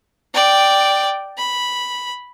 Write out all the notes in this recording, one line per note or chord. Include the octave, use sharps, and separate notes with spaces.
D5 G5
B5